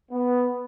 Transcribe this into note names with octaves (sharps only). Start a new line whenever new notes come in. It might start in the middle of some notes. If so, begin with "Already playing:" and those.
B3